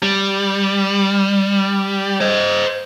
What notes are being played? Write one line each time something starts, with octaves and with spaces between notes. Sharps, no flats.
G3
C5 D#5